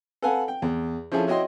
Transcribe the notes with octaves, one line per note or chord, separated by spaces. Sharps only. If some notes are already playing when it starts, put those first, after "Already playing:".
A4 B4 F5 F#5 G#5
G5
E2
F3 C#4 E4 G#4 A4
E4 F#4 C#5 D#5 G5 C6